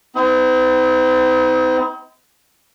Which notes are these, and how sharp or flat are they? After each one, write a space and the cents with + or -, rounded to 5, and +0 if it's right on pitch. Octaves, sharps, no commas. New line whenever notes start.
C4 -40 D#4 +40